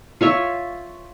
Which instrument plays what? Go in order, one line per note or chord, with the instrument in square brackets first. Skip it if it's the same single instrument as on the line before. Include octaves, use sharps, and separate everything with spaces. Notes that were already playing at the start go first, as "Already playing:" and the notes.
[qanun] F4 C#5 E5